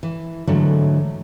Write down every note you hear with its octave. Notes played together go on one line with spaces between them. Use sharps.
E3
G#2 D3 E3 F#3 A3